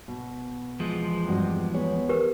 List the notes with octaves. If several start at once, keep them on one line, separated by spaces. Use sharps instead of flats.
B2
E2 F3 G#3
G2 C4 F#4
B3 G#4 C#5
G4 A#4 B4